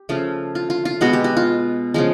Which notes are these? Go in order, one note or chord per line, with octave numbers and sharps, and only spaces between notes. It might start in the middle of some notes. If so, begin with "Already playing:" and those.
Already playing: G4
C#3 F3 A3 F4
F4
F4
F4
B2 G#3 B3 F#4
G4
F#4
F4
C#3 F3 G#3